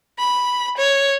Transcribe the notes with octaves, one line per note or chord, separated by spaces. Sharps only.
B5
C#5